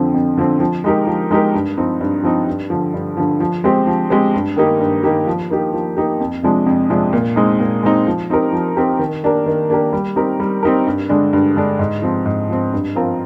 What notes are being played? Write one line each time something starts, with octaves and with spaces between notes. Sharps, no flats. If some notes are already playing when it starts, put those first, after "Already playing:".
Already playing: F2 D3 F3 C4
F2
D3 F3 C4
F3
G#3 D#4 G4 A#4
F3
G#3 D#4 G4 A#4
G2
F3 C4 D#4
G2
F3 C4 D#4
G2
D3 F3
G2
D3 F3
F3
G#3 C4 G4 C5
F3
G#3 C4 G4 C5
G2
D#3 A#3 D#4 G4
G2
D#3 A#3 D#4 G4
F3
A#3 D#4 G4
F3
A#3 D#4 G4
F2
C3 F3 G#3 D4
F2
C3 F3 G#3 D4
A#2
G#3 C4 D#4
A#2
G#3 C4 D#4
F3
C4 D#4 G4 A#4
F3
C4 D#4 G4 A#4
D#3
A#3 D4 G4 A#4
D#3
A#3 D4 G4 A#4
G3
C4 D#4 G4 A#4
G3
C4 D#4 G4 A#4
G2
D3 G#3 D4
G2
D3 G#3 D4
G#2
F3 C4
G#2
F3 C4
G2
F3 C4 F4 A#4